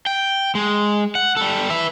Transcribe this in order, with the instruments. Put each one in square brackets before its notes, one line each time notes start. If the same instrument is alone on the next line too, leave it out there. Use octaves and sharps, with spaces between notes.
[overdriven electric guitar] G5
G#3
F#5
G3 A4
B4 E5